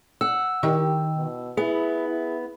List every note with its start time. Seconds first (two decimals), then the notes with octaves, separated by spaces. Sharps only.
0.21 F#5 E6
0.63 D#3 G4
1.16 B2
1.57 B3 E4 G#4
2.08 E4